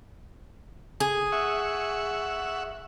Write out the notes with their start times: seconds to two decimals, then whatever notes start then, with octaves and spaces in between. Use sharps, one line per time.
1.00 G#4
1.32 E5 F#5 C#6